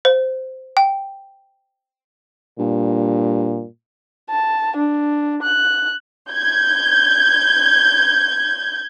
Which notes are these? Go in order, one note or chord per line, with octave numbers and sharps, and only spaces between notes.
C5
G5
G2 A#2
A5
D4
F#6
G6 G#6